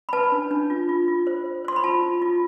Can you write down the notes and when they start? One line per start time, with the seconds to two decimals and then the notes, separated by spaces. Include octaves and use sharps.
0.09 B5
0.13 B4 A5
0.32 D4
0.51 D4
0.70 F4
0.89 F4
1.08 F4
1.27 C5
1.46 C5
1.65 C5 C6
1.76 B5
1.84 F4 A5
2.03 F4
2.22 F4